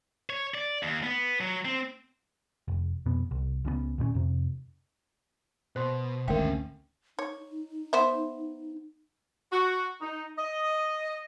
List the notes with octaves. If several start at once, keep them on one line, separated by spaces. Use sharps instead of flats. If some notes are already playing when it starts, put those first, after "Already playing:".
C#5
D5
D#2
B3
F#3
C4
F1
F2 B2 B3
C2
C#2 C#3 G3 B3
D#2 A#2 C4 C#4
F2 C3
B2 C5 C6
G#1 D2 C4 C#4 A#4 E5 F5 G5
D#4 C#5
B3 C5 E5
F#4
D#4
D#5